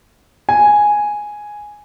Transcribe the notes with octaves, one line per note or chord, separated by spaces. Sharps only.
G#5